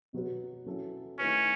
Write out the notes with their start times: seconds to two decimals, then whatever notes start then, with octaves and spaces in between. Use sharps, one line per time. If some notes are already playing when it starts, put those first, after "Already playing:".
0.13 B2 F#3 B3 F#4
0.66 F#3 C#4 E4 A4
1.19 D#3 A3 C#4 E4 B4